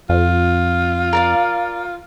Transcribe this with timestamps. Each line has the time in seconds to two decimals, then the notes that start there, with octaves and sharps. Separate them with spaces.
0.09 F2 F4
1.13 A#4 D5 F5